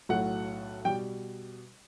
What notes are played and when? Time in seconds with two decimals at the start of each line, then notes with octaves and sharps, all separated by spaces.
0.09 B1 A2 F#3 A3 F#5
0.85 B2 G3 G5